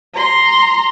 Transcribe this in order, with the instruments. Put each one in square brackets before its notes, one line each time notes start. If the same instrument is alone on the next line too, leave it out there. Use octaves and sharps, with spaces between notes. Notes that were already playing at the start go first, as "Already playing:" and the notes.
[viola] A#5 C6